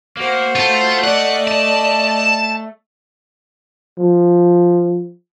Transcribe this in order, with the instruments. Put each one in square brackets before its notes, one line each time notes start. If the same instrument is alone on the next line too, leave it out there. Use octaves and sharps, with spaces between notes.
[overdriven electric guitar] A#3 [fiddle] F#4 C5
[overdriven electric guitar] A3 [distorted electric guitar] F4
[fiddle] D5 D#5 [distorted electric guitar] F#5
[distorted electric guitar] A5
[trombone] F3